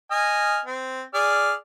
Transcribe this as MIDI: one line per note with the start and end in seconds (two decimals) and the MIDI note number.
0.11 0.60 75
0.11 0.60 80
0.11 0.60 89
0.66 1.02 60
1.14 1.53 68
1.14 1.53 74
1.14 1.53 89